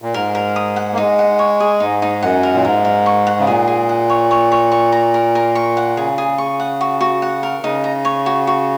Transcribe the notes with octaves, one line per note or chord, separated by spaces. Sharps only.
A#2
G#2 A#4
A#4
D#6
F#5
A#3
G#3 D#4
F#5
C#5
G#4
G#2 D#4
D#4
F#2 F#5
A#4
A#2
G#2 A#4
A#4
C#6
F#5
C#3
A#2 G#4
G#4
F#5
C#5
C#5
C#5
C#6
A#5
A#4
A#4
C#6
F#5
C#3 G#4
G#4
C#6
F#5
F#4
F#4
F#5
A#4
C#3 D#4
A#5
C#5
F#4
F#4